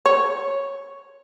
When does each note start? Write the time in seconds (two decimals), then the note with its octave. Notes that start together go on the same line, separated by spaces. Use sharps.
0.06 C#5